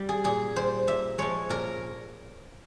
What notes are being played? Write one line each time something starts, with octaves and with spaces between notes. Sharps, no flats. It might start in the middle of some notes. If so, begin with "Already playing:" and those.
Already playing: G3
G#4
A#2 G#4
G3 C5
A#2 E5
F3 G#3 C#5
A#2 A#4